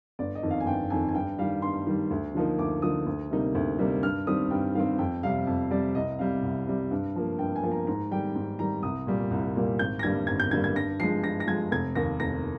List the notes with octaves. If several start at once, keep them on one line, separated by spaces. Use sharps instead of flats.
G1 D5
D#5
F2 D#3
F5
G#5
G1 G5
F2 D#3 G#5
G#5
G2 G5
D#3 G3 F5
G2 C6
D#3 G3
D2
D3 F3 A#3 D#4
D2 D6
D3 F3 A#3 D#4 D#6
D2
C3 G3 A#3 D#4
D2
C3 G3 A#3 D#4
G2 F6
D#3 G3 C4 D#6
G2 G5
D#3 G3 C4 F5
F2 G5
C3 G3 F5
F2
C3 G3 D5
C2 D#5
C3 G3 F5
C2
C3 G3
G2
F3 A#3
G2 G5
G#5
F3 A#3
A#5
G#2 A#5
D#3 G3 G5
G#2
D#3 G3 A#5
C2 D#6
A#2 G3 A#3
C2
A#2 G3 A#3
G#1 G6
A#6
G2 D3 G3 A#3 G#6
G#1 G#6
G6
G2 D3 G3 A#3 G#6
G#6
G2 A#6
F3 G#3 C7
G2 A#6
A#6
F3 G#3 G#6
F1 G#6
D#2 D#3 A#3 A#6
F1 A#6